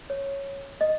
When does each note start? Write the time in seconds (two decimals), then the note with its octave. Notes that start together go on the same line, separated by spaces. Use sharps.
0.10 C#5
0.81 D#5